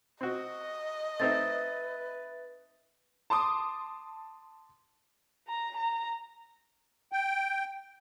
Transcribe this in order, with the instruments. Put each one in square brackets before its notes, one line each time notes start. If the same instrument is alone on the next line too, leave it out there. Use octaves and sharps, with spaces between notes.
[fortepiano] C4 F#4 [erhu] D#5
[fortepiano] A3 C4 D#4 [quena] B4 [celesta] E5 A6
[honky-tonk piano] A5 C6 D6 D#6
[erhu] A#5
A#5
[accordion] G5